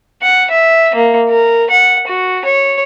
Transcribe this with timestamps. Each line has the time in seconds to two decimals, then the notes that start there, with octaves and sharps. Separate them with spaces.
0.22 F#5
0.51 E5
0.95 A#3
1.29 A#4
1.70 F#5
2.07 F#4
2.45 C#5